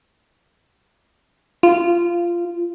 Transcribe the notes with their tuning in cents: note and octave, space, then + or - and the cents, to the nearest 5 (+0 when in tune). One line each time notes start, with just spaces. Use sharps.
F4 -15